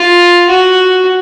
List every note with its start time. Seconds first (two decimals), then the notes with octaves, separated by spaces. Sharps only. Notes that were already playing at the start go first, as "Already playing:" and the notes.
Already playing: F4
0.50 F#4